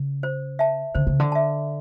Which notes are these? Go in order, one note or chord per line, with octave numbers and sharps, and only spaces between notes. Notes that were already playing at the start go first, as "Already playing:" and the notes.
Already playing: C#3
C5
E5 A5
D3 C5
C#3
D3
E5 A5